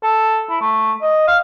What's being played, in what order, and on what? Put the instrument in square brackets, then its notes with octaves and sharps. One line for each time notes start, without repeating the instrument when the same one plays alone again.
[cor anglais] A4
E4
A3
D#5
F5